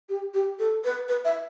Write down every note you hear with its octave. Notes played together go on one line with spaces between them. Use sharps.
G4
G4
A4
B4
B4
E5